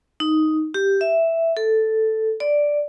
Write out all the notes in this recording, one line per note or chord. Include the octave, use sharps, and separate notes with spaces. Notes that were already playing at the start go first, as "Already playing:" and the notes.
D#4
G4
E5
A4
D5